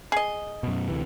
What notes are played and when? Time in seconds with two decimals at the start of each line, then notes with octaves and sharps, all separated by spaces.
0.12 G#4 D#5
0.63 F#2 B2
0.88 D2 C3 E3